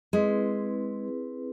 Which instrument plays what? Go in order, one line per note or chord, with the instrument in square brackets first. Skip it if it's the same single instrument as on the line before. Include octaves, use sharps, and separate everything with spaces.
[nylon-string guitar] G#3 [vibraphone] C4 E4 G#4 B4